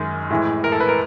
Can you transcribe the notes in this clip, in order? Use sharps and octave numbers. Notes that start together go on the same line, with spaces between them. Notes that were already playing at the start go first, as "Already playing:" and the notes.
Already playing: F#2 D#3 G#3
A2 E3 G#3
A#4
A4
B4
A#4